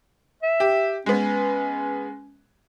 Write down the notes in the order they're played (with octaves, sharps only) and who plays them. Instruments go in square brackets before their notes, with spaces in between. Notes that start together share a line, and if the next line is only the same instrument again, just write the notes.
[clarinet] E5
[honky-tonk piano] G4
[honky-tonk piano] G#3 B3 [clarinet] C#4